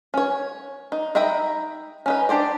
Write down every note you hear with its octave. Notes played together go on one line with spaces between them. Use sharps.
C#4 C#5
D#4
D#4 E5 G5 A#5 B5
C#4 D#4 B4
D4 G4 C5 D5